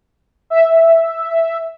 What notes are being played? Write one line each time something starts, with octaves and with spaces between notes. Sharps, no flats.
E5